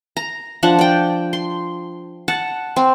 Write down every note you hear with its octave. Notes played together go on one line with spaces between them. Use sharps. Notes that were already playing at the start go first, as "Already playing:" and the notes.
A#5
F3 D4 F#5 A5
D5 G5
C6
F#5 A5
C4